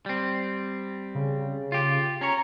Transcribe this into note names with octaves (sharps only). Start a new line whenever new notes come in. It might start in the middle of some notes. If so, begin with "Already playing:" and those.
G3 C4
C#3
F4 G4
C#4 C#5 A#5